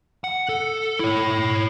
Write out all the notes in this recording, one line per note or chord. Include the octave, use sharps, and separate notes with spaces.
F#5
A4
E4 C#5